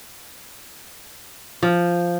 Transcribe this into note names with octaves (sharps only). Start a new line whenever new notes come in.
F3